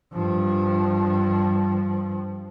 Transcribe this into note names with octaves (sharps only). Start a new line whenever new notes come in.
G2 F3